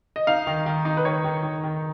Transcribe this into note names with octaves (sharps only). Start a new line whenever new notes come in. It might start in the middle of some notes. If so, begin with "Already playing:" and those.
D#5
D#4 F5
D#3
D#3
D#4
B4
D#3 C#5
D#3
D#3
D#3